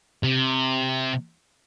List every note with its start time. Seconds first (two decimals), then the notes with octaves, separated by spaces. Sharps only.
0.23 C3